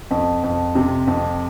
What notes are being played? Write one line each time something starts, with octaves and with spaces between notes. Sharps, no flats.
F2
F2
C3
F2